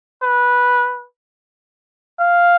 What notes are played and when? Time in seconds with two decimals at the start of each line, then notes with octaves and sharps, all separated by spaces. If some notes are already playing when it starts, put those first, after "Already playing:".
0.23 B4
2.20 F5